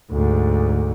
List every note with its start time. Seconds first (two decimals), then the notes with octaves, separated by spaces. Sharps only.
0.12 D2 G#2